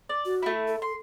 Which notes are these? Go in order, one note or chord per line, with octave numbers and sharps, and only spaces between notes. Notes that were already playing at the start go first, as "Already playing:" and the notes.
D5
F#4
A3 E4
A4
C6